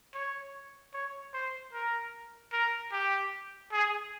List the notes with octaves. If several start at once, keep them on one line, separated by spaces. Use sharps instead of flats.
C#5
C#5
C5
A#4
A#4
G4
G#4